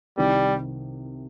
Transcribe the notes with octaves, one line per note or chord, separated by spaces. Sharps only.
C2 C3 D#3 G3